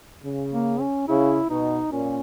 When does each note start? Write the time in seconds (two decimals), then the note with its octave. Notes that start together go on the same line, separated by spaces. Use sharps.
0.24 C#3
0.52 A#3
0.80 C#4
1.08 C#3 E4
1.50 B2 D#4
1.92 A#2 C#4